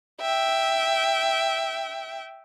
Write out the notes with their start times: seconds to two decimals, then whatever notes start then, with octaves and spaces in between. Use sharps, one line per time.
0.21 E5 G5